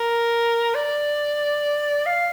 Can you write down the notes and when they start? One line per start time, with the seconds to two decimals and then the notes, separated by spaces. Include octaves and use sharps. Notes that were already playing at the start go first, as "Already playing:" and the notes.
Already playing: A#4
0.75 D5
2.06 F5